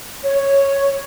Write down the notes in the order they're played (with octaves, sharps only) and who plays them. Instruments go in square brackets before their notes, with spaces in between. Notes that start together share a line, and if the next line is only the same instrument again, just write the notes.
[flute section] C#5